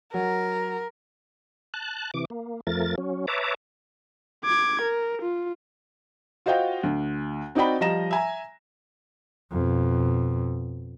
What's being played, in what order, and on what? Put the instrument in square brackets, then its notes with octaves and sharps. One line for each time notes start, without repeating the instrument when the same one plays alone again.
[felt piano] F#3 [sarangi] A#4
[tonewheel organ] A5 F#6
C3 E3 D6
A#3
F2 F3 A3 A#4 A6
F#3 C#4
B4 C#5 E5 A5 A#5 D6
[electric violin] D6 G#6
A#4
F4
[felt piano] F4 F#4 C5 D#5 F5 G5
D2
C4 D#4 F#4 D5 G5 B5
F3 G3 D#5 A#5 A#6 E7
E5 G#5 A#5
[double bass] F2 B2